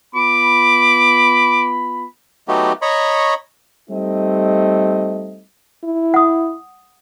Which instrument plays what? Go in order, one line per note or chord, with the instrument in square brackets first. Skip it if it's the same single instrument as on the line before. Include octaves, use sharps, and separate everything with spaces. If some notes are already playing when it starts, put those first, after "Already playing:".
[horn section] B3 F4 B5 [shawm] D6
[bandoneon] F#3 A3 B3 D#4 F#4 G4
C#5 D#5 A#5 B5 C#6
[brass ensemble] G3 A3 C4 D#4 D#5
[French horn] E4
[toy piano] F#5 D#6